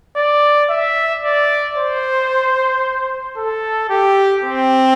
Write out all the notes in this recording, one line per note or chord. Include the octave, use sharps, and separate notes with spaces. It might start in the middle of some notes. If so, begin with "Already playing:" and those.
D5
E5
D5
C5
A4
G4
C4